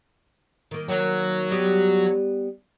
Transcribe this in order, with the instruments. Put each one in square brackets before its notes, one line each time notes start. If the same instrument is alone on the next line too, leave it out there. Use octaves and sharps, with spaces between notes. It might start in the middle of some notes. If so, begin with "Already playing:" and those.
[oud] D#3 A#3
[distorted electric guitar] F#3
[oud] G3 B3 G4